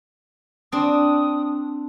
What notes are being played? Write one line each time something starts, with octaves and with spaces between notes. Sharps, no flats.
C4 D4 D#6